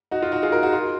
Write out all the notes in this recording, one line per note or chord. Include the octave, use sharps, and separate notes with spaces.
D#4 F#4
F4
D#4 F#4
F4 G#4
F#4 A#4
D#4 F#4
F4